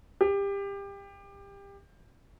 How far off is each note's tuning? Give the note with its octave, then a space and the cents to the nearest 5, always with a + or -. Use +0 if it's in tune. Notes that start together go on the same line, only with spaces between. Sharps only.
G4 +25